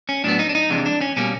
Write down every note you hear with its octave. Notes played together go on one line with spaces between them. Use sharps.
C#4
A2 F#3 B3 D4
D#4
D4
D#4
F2 C3 E3 G#3 D4
D4
C#4
B2 G3 A#3 C#4